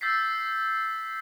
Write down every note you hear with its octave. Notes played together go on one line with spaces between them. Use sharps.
E6 G6 A6 B6 C7